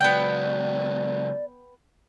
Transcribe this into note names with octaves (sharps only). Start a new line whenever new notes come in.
C#2 F#3 B3 D5 G5